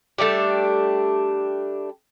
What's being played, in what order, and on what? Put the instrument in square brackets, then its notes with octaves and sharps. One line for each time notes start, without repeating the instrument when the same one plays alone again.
[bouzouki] G3 A3 D4 G4